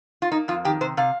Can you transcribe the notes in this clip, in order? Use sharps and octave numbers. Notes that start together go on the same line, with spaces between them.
F4
A#3 D#4
F2 F4
D#3 G4
C3 C5
C3 F5